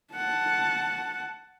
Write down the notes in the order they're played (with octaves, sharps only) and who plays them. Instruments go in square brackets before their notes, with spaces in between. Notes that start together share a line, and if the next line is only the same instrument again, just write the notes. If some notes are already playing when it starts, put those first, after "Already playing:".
[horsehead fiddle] F#5 A5